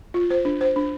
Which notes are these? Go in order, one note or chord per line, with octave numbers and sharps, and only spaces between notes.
F4
C5
D4
C5
D4